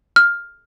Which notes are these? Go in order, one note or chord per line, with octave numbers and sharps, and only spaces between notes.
F6